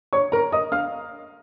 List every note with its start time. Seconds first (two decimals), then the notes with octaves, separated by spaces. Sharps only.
0.13 C#5 C#6
0.32 A#4 A#5
0.52 D#5 D#6
0.72 F5 F6